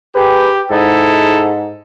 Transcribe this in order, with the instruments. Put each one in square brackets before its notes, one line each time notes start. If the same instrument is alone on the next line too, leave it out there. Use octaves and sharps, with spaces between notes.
[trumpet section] G4 [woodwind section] G#4 A#4 B4
[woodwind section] G#2 [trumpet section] D#4 E4 A4